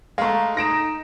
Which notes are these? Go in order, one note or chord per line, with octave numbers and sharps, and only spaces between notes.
G#3 A3 F5 A#5
D#4 A#6 D7 E7